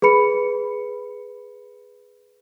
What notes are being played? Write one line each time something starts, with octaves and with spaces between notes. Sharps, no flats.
G#4 B4 B5 C#7